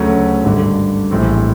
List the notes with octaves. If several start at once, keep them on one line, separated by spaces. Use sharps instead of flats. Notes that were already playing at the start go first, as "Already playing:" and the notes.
Already playing: D2 C#3 F#3 A3 C#4
G#1 G2 D3
A#1 A2 E3 G3 C4